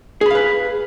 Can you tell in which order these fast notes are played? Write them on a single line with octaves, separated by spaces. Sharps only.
G#4 B5 F5 B4